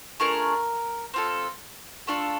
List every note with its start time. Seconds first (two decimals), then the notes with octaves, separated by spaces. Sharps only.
0.20 A3 D4 F4 G#4 A#4
1.14 C4 F4 A4
2.07 A3 D4 F4 A4